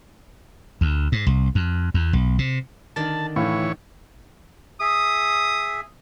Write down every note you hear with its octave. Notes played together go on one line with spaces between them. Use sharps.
D2
G#2
C2
F2
E2
B1
C3
D3 D#3 D5 A5
A2 E3 C#5 F5
G#4 E5 D#6